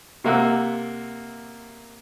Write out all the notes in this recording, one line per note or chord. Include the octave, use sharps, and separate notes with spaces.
C3 A#3 F#5 E6